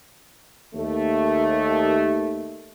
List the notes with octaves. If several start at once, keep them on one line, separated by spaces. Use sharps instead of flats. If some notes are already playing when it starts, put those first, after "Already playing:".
D#2 A3